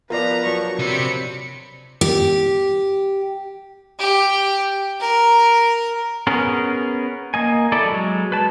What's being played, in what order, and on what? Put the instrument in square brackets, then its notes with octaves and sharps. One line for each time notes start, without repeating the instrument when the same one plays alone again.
[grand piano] F3 B3 F4 [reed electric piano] A#4 D5 [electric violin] B4 A#5
[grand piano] F3 F#3 D4 [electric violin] C#6
[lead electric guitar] C3 C4 [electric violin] B5 C#7
[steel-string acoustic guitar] G4
[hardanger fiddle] G4
A#4
[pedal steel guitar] B3 C#4 G#4 A#4
A#3 D#5 G#5
E4 A4 D5
F#3 G#3
B4 A5